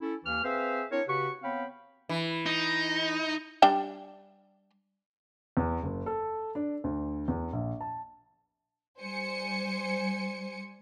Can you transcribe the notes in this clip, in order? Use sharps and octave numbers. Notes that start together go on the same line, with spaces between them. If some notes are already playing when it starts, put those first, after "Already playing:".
C#4 E4 A4
D#2 E3 F6
C4 G#4 B4 C5 E5 F5
C4 D4 E4 A#4 C#5
C#3 F#4 G4 B4 C#6
B3 C4 C#5 F5 G5 B5
E3
D#4
G3 D4 G5
E2
F#1
A4
D4
D2
E2
A#1
A5
G3 C5 G#5 C#7